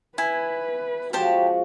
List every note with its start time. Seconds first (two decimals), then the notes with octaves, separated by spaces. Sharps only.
0.18 E4 B4 G#5
1.13 C#3 F3 G#3 F#4 G4 C5 A5